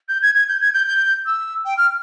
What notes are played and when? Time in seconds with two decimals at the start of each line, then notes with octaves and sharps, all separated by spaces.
0.08 G6
0.22 G#6
0.35 G#6
0.48 G6
0.61 G#6
0.74 G6
0.86 G6
1.26 E6
1.65 G5
1.77 F6